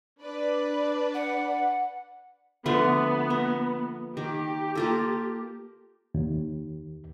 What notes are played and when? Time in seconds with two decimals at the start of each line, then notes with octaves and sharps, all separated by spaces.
0.21 D4 B4 D5
1.14 F#5
2.66 D3 F3 A3 B3
3.30 A#3
4.17 D#3 G4
4.75 A#3 F4 A4
6.14 D#2